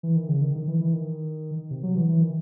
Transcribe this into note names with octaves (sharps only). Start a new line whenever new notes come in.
E3
D#3
C#3
D#3
D#3
E3
E3
D#3
C3
F#3
E3
E3
D#3